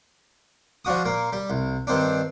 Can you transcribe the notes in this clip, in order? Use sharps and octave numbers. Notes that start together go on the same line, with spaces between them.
F3 D4 F#4 D#6
A#2 A#3
G3
C2
G2 D#3 C4 D4